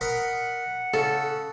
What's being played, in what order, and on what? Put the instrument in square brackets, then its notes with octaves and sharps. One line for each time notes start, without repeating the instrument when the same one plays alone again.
[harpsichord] A#4 D#5 B5 [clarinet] F#5
[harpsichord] C#3 [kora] A4